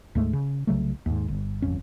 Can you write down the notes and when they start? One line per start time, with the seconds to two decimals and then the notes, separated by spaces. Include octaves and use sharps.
0.15 D2 G#2 G#3 A3
0.33 C#3
0.67 C2 C#3 F#3 A3
1.06 D#2 G#2
1.28 G1
1.62 D1 G1 F2 C#4